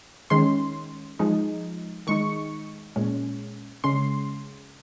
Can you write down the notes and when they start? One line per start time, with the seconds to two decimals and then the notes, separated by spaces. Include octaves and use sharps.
0.30 D#3 G#3 C#4 C6
1.19 F3 G#3 D#4
2.07 D#3 G#3 D#4 C#6
2.96 A#2 G#3 C#4
3.84 C#3 G#3 C#4 C6